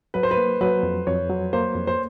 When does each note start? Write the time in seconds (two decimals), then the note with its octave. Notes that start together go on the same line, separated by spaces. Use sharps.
0.14 F#3 B4
0.23 C5
0.31 B4
0.37 A#3
0.61 F#3 B4
0.83 F2
1.07 F2 C#5
1.30 F#3
1.53 A#3 C5
1.75 F2
1.87 C5